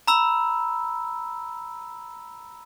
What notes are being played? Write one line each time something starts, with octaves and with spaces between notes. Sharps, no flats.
A#5 B5 E6